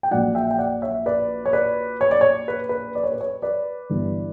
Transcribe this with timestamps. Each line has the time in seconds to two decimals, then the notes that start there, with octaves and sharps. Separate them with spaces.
0.03 G5
0.11 A#1 A#2 F#3 D5 F#5
0.35 E5 G5
0.51 G5
0.58 D5 F#5
0.82 C#5 E5
1.06 B4 D5
1.46 C#5
1.53 B4 D5
2.01 C#5
2.11 D5
2.21 C#5
2.48 B4
2.69 B4
2.95 D5
3.03 C#5
3.12 B4
3.21 C#5
3.42 B4 D5
3.90 G1 G2 E3 G3